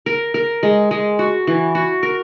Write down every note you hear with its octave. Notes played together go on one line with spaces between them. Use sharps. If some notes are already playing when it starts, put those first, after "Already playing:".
A#4
A#4
G#3
G#3
F#4
E3
F#4
A#4